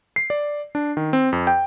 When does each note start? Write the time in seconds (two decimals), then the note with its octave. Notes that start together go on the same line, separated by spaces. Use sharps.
0.16 C7
0.30 D5
0.75 D4
0.97 D#3
1.13 C4
1.32 F2
1.47 G5